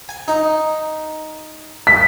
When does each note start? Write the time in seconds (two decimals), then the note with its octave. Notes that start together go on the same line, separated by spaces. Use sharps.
0.09 G#5
0.28 D#4
1.87 B6